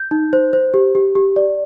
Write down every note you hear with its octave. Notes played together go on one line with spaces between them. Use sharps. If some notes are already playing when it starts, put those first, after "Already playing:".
Already playing: G6
D#4
C5
C5
G4
G4
G4
D5